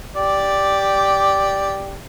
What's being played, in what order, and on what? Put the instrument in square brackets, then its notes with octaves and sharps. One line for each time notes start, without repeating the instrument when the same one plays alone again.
[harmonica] G4 D5